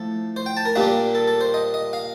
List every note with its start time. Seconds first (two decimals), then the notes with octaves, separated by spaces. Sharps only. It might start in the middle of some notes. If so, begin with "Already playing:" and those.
Already playing: A2 F3 A4
0.36 C5
0.46 G5
0.57 A5
0.65 A#4
0.76 A#2 G3 A#3 D4
1.15 A4
1.27 A4
1.41 C5
1.54 D#5
1.74 D#5
1.93 F5